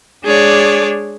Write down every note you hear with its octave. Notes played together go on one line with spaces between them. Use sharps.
G#3 D4 G#4 C#5 D5